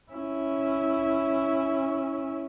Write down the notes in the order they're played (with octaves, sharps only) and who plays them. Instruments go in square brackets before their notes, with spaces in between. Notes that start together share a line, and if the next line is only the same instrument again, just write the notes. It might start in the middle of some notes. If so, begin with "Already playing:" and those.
[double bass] C#4 E4